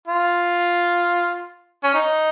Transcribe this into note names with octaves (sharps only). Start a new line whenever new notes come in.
F4
C#4
D#4